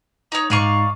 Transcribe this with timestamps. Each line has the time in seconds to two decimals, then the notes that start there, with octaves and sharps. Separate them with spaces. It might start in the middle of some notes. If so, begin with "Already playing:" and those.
0.32 D#4 C#5
0.50 G#2 D5 F5 C#6 D#7